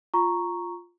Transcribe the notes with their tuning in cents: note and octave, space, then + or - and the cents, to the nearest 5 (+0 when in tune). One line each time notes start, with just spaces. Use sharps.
F4 +0 A#5 +0 C#6 +0